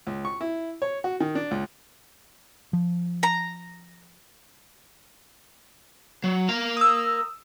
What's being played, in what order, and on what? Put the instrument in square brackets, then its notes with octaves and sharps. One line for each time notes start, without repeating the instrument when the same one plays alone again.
[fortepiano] C#2
C#6
E4
C#5
F#4
D#3
D4
C#2
[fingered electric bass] F3
[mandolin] A#5
[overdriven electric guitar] F#3
A#4 F5
[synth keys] D#6 E6